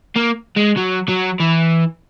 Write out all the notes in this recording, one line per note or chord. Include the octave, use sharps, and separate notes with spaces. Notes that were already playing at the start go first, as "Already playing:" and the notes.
A#3
G#3
F#3
F#3
E3